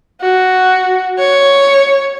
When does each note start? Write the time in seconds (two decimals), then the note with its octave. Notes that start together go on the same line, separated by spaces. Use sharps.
0.21 F#4
1.19 C#5